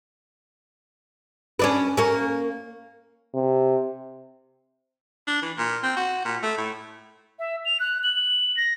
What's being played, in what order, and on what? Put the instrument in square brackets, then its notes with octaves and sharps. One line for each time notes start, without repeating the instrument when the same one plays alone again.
[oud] C#4 D4 B4
A#3 C#4
[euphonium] C3
[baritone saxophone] D4
E3
A#2
C4
F#4
A#2
A3
A2
[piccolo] E5
F7
F#6
F#7
A#6